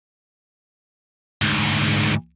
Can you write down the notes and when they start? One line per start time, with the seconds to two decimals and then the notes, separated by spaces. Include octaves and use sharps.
1.42 D2 G#2